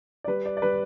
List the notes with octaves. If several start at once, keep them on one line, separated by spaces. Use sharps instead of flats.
D5
G3 B4
D5
D5
G3 B4